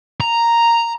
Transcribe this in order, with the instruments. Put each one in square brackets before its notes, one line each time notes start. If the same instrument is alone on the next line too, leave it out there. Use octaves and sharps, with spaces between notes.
[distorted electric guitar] A#5